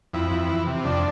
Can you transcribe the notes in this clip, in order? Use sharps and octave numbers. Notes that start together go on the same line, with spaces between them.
F2 E4
F2
E3
C3
F2 D4